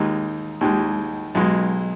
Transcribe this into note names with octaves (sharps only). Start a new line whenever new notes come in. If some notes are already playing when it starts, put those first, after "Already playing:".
Already playing: D#2 D#3 G#3
D#2 D#3 G#3
B1 B2 G#3